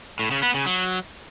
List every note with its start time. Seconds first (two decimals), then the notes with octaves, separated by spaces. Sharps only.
0.19 A2
0.31 C#3
0.43 B3
0.54 C#3
0.66 F#3